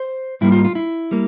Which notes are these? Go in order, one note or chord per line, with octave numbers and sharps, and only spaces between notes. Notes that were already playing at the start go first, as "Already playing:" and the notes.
Already playing: C5
G#2 G3 A#3 E4
F4
F4
E4
G3 A#3